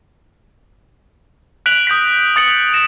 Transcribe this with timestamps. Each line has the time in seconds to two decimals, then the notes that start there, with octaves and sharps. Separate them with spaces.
1.66 F#6 B6 D7 F7 F#7
1.87 D#6 G6 A#6 B6
2.36 D#6 A6 C#7 F#7
2.74 A#6 C#7 E7